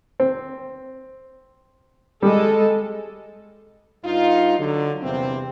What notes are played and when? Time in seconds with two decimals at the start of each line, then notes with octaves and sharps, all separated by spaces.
0.20 C4
2.23 G3 G#3 A4
4.05 G2 D#4 F4
4.59 D3 F#3
5.02 E2 C3 G3 A#3 C4